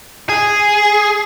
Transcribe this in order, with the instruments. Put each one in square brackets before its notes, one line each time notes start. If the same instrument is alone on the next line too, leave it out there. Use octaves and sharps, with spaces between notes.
[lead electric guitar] G#4